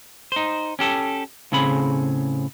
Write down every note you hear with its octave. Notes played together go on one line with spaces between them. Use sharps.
D#4 C5
C#4 G4 A4
A2 C#3 C4 G#4 B5